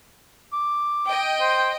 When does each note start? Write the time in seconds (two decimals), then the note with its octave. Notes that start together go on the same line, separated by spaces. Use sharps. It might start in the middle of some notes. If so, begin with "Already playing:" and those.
0.53 D6
1.08 D#5 G5
1.41 C5